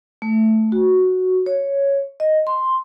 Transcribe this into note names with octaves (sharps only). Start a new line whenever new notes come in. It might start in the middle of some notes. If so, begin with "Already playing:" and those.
A3
F#4
C#5
D#5
C6